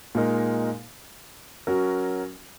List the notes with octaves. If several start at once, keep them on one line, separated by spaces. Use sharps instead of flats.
A#2 G#3 D#4 A#4
F#3 C#4 F#4 A#4